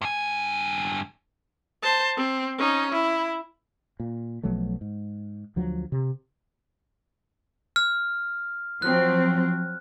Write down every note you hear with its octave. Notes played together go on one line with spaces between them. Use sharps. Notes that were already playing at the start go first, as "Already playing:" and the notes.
G2 G#5
C5 A5
C4
C#4 D#4
E4
A#2
B1 F3 F#3 A3
G#2
D2 F3 F#3
C3
F6
F3 F#3 C4 F#6